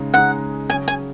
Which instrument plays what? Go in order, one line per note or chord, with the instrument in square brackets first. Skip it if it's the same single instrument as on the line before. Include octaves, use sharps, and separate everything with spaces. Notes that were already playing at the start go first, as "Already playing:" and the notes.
Already playing: [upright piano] C#3 G#3 D#4 G#4
[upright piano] C#3 G#3 D#4 G#4 [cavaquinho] F#5
[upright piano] C#3 F#3 C#4 G#4 [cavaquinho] G#5
[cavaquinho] G#5